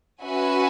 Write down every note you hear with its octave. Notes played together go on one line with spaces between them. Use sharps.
C#4 F#4 B4 E5 G#5